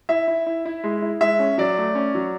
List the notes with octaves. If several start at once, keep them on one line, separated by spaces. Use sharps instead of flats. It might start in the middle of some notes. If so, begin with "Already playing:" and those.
E4 E5
E4
E4
E4
G#3
E4
G#3 E5
C#4
F#3 D5
A3
C#4
F#3